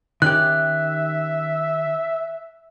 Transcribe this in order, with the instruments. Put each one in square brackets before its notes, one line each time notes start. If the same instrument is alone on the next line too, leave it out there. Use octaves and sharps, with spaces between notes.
[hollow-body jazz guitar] D#3 C#4 G4 [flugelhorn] E5 [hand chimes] F#6